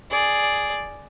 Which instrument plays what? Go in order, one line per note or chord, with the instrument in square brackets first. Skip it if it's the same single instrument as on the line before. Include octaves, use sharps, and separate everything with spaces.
[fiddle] G#4 D5